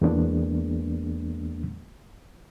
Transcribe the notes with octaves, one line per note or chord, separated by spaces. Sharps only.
E2 G#3 A#3 B3 D4